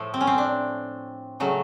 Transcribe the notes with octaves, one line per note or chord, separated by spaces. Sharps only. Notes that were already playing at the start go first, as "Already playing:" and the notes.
Already playing: A2 F3 A3
C4
C#4
C4
D4
C#3 F#3 A3